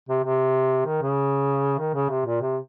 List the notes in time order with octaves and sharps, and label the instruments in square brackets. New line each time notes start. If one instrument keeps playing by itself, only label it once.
[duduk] C3
C3
D#3
C#3
D#3
C#3
C3
A#2
C3